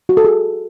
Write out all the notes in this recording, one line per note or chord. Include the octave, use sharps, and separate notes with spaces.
F#4
A4
G#4